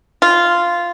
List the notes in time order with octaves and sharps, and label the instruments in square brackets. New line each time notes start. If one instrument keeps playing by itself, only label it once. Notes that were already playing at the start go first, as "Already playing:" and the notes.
[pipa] F4